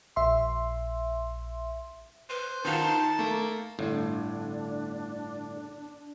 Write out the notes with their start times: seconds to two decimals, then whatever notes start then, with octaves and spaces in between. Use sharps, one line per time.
0.16 A#1 E5 C6
2.30 B4 C5
2.65 D#3 D#4 F4 F#4 A5
3.19 A3 A#3
3.79 G1 A2 D4